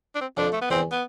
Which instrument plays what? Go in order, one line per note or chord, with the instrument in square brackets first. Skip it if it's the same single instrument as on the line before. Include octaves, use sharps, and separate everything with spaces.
[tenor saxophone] D4
C4
[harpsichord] F2 F3 [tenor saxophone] D4
[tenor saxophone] A3
B3
[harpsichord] E2 E3 [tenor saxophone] C4
[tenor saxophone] B3